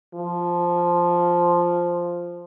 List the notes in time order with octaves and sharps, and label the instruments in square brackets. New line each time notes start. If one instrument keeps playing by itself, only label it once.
[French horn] F3